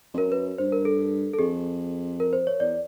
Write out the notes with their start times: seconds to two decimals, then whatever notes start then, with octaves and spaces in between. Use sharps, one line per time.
0.14 F2
0.18 F#2 A#4
0.32 B4
0.58 G2 C5
0.72 A#4
0.85 A4
1.33 A4
1.39 F2 G#4
2.20 A#4
2.33 C5
2.47 C#5
2.60 E2 D5